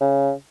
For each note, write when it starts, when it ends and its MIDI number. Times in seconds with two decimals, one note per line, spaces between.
0.01 0.32 49